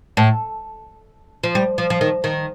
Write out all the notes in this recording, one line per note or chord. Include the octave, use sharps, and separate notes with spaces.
A2
F3
G3
F3
F3
D#3
D#3